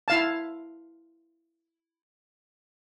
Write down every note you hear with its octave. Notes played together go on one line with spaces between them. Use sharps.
E4 F5 A5